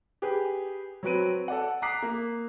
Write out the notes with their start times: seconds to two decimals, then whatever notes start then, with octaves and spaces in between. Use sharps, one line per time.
0.22 G4 G#4 B4
1.03 F#3 C4 F#4 B4 D7 D#7
1.48 A4 D5 F#5
1.82 A#5 D6 D#6 F#6 B6 C7
2.02 A#3